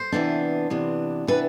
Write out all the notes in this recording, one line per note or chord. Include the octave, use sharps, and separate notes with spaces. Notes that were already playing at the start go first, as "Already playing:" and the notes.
Already playing: C5
C3 E3 B3 D4
C3 E3 B3 D4
C3 E3 B3 D4 B4